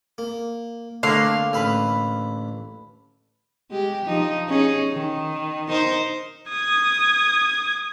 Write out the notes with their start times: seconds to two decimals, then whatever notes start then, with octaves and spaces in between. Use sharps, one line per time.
0.18 A#3
1.03 D3 A3 A#3 C4 D4 F5 D6
1.53 A1 B4 E5 B5 F6
3.70 G#3 G4
4.06 F3 D#4
4.48 C#4 D#4 G#4
4.92 D#3
5.68 D#4 A#4 C5
6.49 D#6 G#6